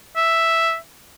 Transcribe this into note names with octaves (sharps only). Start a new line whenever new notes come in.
E5